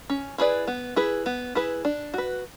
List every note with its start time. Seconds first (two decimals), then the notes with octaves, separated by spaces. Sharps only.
0.10 C#4
0.38 E4 G#4 B4 D5
0.67 B3
0.96 E4 G#4 B4
1.26 B3
1.55 E4 G#4 B4
1.85 D4
2.14 F#4 B4